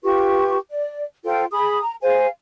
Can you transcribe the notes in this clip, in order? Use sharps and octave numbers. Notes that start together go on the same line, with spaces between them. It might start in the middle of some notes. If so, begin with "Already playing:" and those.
F4 G4 B4 C#6
D5
F4 A4 C5 G5
G#4 B5 D#6
A#5
G#4 C5 F5 G#5